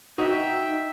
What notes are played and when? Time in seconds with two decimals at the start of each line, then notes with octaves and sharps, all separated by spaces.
0.18 D#4 F#4 E5 G5